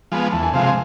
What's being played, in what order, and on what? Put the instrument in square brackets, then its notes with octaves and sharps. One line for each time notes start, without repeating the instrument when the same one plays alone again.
[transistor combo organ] F3 G#3 B3
[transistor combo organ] E2 [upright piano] A5
[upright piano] G#5
[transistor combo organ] C3 F3 G#3 [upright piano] F5
[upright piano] G#5